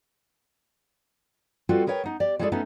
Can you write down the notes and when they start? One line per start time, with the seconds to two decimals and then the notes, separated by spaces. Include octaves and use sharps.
1.69 G3 C4 F4 F#4 A4 B4
1.86 G#4 A#4 B4 C#5 F#5 G5
2.04 B3 D#4
2.20 G4 D5
2.39 G3 G#3 E4 G#4 A4 D5
2.52 A3 B3 C#4 D#4 A4